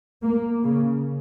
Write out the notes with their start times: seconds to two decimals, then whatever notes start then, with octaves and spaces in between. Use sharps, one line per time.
0.22 A#3
0.63 C#3